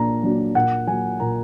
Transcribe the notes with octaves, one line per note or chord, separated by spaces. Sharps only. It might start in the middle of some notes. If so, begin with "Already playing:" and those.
Already playing: A#2 A#3 D4 A#5
F#3 A#3 D4
A#2 F#5
F#3 A#3 G#5
A#2 A#5